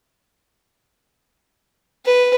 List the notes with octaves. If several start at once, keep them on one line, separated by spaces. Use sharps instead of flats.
B4